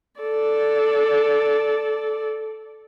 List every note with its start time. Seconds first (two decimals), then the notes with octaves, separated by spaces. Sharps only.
0.20 A4 D5